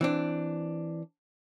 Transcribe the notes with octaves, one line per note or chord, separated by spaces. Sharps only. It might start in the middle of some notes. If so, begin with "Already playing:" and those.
E3 C4 D4